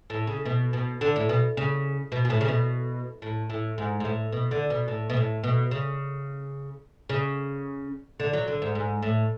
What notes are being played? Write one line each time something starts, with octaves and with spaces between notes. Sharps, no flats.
A2
C#3
B2
B2
D3
A2
B2
C#3
B2
B2
A2
C#3
B2
A2
A2
G#2
G#2
A2
B2
D3
B2
A2
B2
A2
B2
C#3
C#3
D3
F#3
D3
G#2
G#2
A2